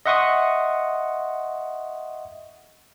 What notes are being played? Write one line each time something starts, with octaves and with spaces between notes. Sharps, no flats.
D#5 E5 F#5 C6 C#6 D#6